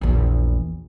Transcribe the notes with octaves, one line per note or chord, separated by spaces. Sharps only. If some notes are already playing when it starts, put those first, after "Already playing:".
A#1 E2